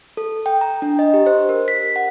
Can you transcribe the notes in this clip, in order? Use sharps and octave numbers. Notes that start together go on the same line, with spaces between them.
A4
G5
A#5
D4
D#5
G4
C5
A#4
B6
F#5